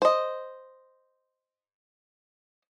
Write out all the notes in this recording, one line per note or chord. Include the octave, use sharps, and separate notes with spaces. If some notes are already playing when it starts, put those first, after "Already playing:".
C5 D#5